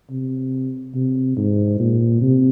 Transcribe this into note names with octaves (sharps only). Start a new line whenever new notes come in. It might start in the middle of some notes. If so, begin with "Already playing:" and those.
C3
C3
G#2
A#2
C3